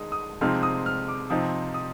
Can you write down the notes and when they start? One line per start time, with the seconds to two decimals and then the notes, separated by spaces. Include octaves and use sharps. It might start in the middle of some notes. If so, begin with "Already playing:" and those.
Already playing: D#3 G#3 D#4 D#6
0.12 D#6
0.41 C3 F3 G#3 C4 D#4 F6
0.63 D#6
0.86 F6
1.08 D6
1.30 C3 F3 C4 D#4 D#6
1.74 D#6